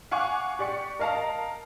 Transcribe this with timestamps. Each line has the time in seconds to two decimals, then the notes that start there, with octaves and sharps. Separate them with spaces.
0.11 F5 F#5 G#5 C#6 D6 F#6
0.59 G4 D5 C#6 C#7
0.99 A#4 D#5 F5 A5 A#5